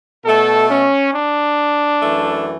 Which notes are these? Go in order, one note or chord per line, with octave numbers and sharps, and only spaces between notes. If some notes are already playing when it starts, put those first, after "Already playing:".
B2 A3 A4
C#4
D4
F#2 E3 A3